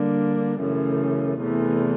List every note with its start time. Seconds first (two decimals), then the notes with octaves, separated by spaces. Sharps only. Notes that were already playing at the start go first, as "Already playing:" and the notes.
Already playing: D3 G3 A#3 D4
0.61 F#2 C#3 E3 A3
1.40 E2 C3 E3 A3